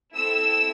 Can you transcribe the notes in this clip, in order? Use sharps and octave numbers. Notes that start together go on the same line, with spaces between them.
C4 E4 A4 E6